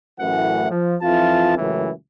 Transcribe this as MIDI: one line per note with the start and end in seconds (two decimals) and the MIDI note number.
0.20 0.68 33
0.20 0.68 42
0.20 0.68 45
0.20 0.68 52
0.20 0.68 78
0.70 0.95 53
1.02 1.57 41
1.02 1.57 52
1.02 1.57 64
1.02 1.57 65
1.02 1.57 81
1.58 1.91 37
1.58 1.91 42
1.58 1.91 45
1.58 1.91 52